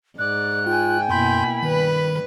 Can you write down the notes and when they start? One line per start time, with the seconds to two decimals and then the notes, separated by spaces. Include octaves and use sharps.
0.19 G#2 D5 F#6
0.67 F4 G5 G#5
1.10 F#2 B2 A#3 E4 B5 C6 G6
1.63 G2 D#3 B4